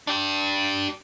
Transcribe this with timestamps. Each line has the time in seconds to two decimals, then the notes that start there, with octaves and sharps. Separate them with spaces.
0.07 D4 G4